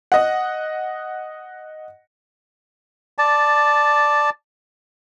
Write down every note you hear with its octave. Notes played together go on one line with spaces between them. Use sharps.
D#5 F#5
D5 A5